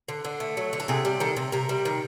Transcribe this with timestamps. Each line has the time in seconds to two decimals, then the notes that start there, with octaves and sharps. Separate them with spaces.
0.08 D3
0.25 D3
0.40 A3
0.57 F#3
0.73 D3
0.80 A4
0.88 C3 G#4
1.05 G3
1.20 D#3 A4
1.36 C3
1.52 C3 A#4
1.69 G3
1.85 D#3